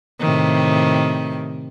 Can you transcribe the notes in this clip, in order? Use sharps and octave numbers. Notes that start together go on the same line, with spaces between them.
A2 C3 D#3